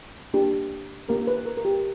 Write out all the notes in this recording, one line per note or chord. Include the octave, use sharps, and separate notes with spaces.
A#3 D4 G4
A#3 D4 G4 A#4
B4
A#4
A#4
G4